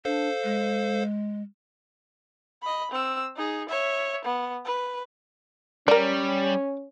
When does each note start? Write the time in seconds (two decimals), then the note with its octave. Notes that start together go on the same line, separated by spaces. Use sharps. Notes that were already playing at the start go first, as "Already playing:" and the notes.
0.05 D4 A4 C5 F5
0.44 G#3
2.62 D#5 B5
2.92 C4 E6
3.36 D#4 G#4
3.69 C#5 E5
4.25 B3
4.65 B4
5.88 G3 C#4 A#4 D5